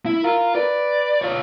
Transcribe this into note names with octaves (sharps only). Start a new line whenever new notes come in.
E4
F4 A#4
B4 D5
F4 C#5